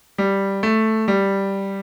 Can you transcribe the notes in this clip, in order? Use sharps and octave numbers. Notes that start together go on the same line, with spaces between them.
G3
A3
G3